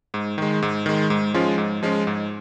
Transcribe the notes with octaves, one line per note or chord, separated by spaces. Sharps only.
G#2
D#3 G#3
G#2
D#3 G#3
G#2
F3 G#3 C#4 F4
G#2
F3 G#3 C#4 F4
G#2